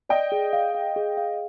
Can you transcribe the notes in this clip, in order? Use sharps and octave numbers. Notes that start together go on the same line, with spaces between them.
D5 D#5 G5
G#4
F5
F5
G#4
F5